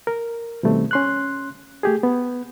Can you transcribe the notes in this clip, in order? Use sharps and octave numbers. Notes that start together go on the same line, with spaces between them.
A#4
B2 D#3 G3 A3 C4
C#4 C6 F#6
A3 G4 G#4
B3